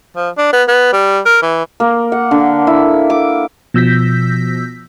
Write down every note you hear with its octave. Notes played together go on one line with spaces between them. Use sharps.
F3
D4
B3
B3
G3
A#4
E3
A#3
F#5
D3
E4
D6
B2 F3 E6 G6 A#6 B6